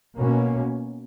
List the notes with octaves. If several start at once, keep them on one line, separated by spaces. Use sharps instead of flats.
B2 A#3 C#4